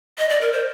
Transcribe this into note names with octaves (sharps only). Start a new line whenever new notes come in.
D#5
D5
A#4
C5